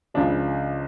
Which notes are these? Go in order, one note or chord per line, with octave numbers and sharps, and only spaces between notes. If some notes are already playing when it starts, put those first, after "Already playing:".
C#2 C#3 F3 D4